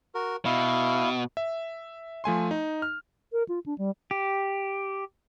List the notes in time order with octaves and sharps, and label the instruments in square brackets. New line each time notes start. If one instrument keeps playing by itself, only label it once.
[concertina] F#4 A#4
[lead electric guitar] B2 [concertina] E4 F5
[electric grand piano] E5
F3 A3 G#5 C6
D#4
F6
[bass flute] A#4
F4
D4
G3
[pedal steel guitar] G4